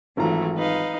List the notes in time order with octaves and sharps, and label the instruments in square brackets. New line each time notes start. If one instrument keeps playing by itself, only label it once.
[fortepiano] G#1 F4 A#5 [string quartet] E3 F#3 A3
[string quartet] D#4 B4 F5